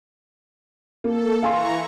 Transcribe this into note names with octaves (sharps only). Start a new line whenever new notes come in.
A#3 A4
E3 F5 G#5 A#5 C6 C#6